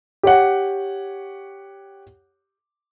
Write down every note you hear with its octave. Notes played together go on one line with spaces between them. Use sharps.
G4 C#5 F#5